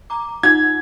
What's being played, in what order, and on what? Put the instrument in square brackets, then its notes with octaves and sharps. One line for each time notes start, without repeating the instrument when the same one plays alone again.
[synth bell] A#5 D6
[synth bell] D#4 F4 F#5 [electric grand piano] G#6